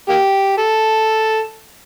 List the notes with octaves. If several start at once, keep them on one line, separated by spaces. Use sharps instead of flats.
A#3 G4
A4